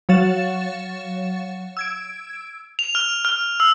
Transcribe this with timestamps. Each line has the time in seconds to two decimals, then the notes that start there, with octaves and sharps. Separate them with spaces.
0.09 F#3 C#5 F5 F#5 A6 E7
1.77 E6 G#6 D7
2.79 F7
2.95 F6
3.25 F6
3.60 E6